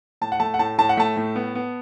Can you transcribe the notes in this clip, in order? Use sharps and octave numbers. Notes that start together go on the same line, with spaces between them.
A2 A5
F#5
A3 A5
F#5
A2 A5
A2 A5
F#5
A3 A5
A2
B3
B3